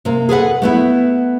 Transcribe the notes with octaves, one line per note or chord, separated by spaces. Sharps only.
C3 A#3
G#4 A4 B4 F#5
A3 B3 E4